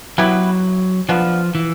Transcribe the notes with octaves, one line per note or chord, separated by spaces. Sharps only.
F#3 B3 E4 G4 B4
F3 B3 D4 F4
E3